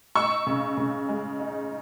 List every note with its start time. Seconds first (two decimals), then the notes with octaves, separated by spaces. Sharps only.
0.16 D#4 C#6 E6
0.47 C#3
0.77 C#3
1.09 G#3
1.39 D#4